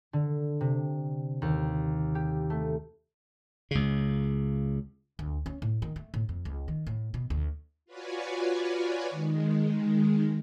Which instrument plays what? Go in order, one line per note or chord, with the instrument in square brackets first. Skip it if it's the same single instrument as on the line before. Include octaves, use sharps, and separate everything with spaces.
[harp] D3
C3
D#2
G4
A3
[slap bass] C#2 C#3
[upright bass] D2
C#4
A2
D#3
A3
A2
F2
C#2
D#3
A2
B2
D2
[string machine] F4 F#4 B4 C#5 D5 G#5
D#3 G#3